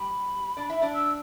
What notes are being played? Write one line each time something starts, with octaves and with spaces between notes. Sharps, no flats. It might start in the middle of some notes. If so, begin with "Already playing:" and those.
Already playing: G3 G4 B5
D4 D5
E4 E5
D4 D5
E6